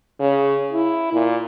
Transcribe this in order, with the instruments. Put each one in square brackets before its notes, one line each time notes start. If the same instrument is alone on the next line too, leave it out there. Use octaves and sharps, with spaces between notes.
[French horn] C#3
E4
A#2